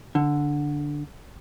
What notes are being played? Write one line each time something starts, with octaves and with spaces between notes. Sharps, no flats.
D3